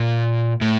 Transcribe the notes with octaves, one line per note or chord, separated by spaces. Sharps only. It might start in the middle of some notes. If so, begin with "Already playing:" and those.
Already playing: A#2
A2